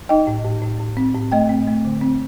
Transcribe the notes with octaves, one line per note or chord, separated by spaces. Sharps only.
D#4 D#5 G5
A2
A2
A2
A2
C4
A2
A3 D#5 G5
C4
A3
D3
C4